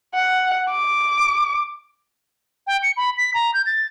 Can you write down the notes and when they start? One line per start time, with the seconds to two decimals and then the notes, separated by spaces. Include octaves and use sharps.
0.15 F#5
0.70 D6
2.67 G5
2.83 C#7
2.97 B5
3.17 B6
3.34 A#5
3.54 G6
3.66 A6